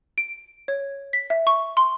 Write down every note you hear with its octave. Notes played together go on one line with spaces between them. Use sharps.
D7
C#5
B6
E5
C#6
C6